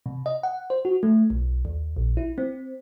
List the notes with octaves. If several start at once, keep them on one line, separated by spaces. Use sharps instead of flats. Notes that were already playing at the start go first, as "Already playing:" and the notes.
C3
D#5
F#5
C5
F#4
A3
B1
D#2
A#1
E4
C4